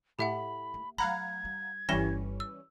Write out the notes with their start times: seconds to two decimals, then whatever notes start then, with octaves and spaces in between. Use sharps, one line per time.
0.19 A2 G4 E5 F#5 B5
0.74 A#3
0.98 F#3 A3 F5 F#5 A#5 B5 G#6
1.45 G3
1.89 G1 E3 G3 C#4 E4 A#6 E7 G7
2.40 E6